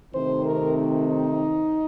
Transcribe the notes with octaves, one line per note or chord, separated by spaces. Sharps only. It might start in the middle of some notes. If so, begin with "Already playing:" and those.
C3 D#3 A3 C4 C5
A#4
D#4